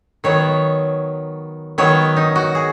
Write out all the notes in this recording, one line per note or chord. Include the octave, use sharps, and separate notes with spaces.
D#3 F#3 B3 C#5
D#3 F#3 B3 C#5
D#4
F#4
G#4